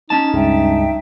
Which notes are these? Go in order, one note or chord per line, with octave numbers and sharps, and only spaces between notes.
C#4 D#4 A5
C#2 G2 G#3 E5 G5